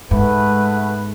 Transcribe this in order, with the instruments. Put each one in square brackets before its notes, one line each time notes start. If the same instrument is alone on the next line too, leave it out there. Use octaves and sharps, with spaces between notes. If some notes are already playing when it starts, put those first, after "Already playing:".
[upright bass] G#2 [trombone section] A3 B3 B4